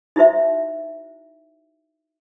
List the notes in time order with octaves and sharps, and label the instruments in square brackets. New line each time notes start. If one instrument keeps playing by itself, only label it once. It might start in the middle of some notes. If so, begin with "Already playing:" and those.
[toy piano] D#4 E4 F#4 C5 E5